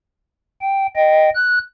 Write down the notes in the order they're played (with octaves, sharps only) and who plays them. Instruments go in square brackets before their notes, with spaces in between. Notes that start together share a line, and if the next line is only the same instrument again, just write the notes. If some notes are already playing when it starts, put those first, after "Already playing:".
[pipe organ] G5
D#5 G5
F#6